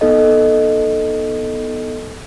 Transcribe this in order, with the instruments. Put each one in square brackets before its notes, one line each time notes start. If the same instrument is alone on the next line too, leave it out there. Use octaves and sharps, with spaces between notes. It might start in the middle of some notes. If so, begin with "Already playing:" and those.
[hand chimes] B3 D#4 A4 D#5